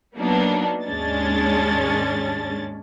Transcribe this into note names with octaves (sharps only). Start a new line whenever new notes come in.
F#3 A#3 B3 D4 D#4
D#2 G#2 G#3 C#4 D4 A6